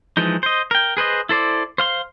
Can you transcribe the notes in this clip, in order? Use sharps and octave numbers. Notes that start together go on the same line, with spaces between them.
E3 F3 G#3 D#4
C5 D#5
A#4 G5
G#4 B4 C5 D#5
E4 A4 C5 D5
C5 F5 C6